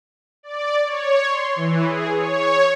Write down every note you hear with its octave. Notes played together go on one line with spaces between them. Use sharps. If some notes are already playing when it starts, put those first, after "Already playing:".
D5
C#5
C6
E3
G#4
C#5